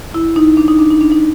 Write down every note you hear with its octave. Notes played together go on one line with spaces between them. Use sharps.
E4
D#4
D4
D#4
D4
D#4
D4
D#4